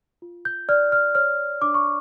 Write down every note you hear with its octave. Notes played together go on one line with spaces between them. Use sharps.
F4
G6
D5 F6
F6
C#5 F6
D4 D6
C#6